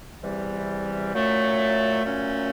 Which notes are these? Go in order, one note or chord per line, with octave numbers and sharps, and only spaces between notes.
E2 C3 E3 G3
A#2 F#3 A3 C#4
A#2 F#3 A3 C#4